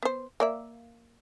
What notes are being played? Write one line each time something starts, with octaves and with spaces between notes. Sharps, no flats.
B3 C5
A#3 D5 E5